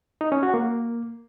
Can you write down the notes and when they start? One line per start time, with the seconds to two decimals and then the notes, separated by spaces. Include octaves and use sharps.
0.21 D#4
0.32 C#4
0.43 F#4
0.54 A#3